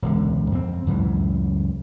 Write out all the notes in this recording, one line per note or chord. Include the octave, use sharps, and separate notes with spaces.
E1 C#2 D3
F2 C4
C#2 F#2 A2 E3